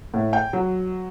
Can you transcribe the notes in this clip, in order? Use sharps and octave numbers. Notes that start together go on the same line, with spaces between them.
A2
G5
F#3